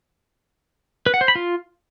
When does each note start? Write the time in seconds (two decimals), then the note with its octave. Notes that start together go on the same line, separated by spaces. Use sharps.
1.06 B4
1.14 F#5
1.21 C5
1.28 B5
1.35 F4